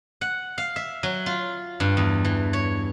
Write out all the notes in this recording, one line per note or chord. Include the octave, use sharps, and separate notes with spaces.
F#5
F5
E5
F#3
F4
G2
E2
E3
C#5